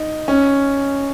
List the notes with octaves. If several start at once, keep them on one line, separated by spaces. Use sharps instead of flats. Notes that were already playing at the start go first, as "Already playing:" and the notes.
Already playing: D#4
C#4